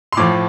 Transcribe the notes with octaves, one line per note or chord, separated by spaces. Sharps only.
C6
A2 F3 D6